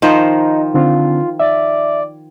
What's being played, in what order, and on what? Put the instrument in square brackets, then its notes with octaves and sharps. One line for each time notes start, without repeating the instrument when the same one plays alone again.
[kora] D#3 F3 C5 [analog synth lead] D#4
[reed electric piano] D3 C4 D4 [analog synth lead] F4
[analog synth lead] D5 [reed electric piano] E5